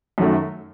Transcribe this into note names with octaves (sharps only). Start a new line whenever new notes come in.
F#2 D#3 F#3 A3